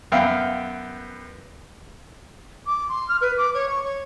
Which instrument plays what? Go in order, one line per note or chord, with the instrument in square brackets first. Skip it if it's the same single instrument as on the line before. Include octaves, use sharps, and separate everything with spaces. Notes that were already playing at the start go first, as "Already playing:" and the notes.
[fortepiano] F#2 B3 E5 F5 G5
[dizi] D6
C6
F6
B4
D6
C#5
C#6
C#5